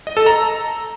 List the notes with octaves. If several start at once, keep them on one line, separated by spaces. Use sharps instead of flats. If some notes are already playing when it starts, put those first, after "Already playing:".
D#5
A4
A#5